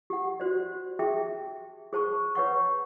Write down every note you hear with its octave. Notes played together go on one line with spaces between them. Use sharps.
G4 F#5
F#4 C5 D5
G4 G#4 E5 G5 A5
G#4 C5 A5 C#6
B4 C#5 F#5 C#6